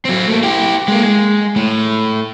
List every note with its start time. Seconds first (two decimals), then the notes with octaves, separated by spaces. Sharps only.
0.05 F#3 C4
0.28 A3 A#3
0.43 E4 G4
0.88 G#3 A#3
1.04 G#3
1.56 A2